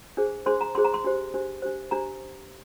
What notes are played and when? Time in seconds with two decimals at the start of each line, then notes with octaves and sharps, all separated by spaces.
0.17 D4 G#4 C5
0.46 D4 G#4 C5 C6
0.61 A#5
0.75 D4 G#4 C5 C6
0.84 A#5
0.94 C6
1.04 D4 G4 C5
1.34 D4 G4 C5
1.62 D4 G4 C5
1.91 D4 G4 C5 A#5